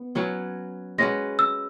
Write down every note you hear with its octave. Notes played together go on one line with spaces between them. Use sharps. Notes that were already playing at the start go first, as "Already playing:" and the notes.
Already playing: B3
F#3 C#4 F#4 B4
G#3 C#4 F#4 B4 A#6
E6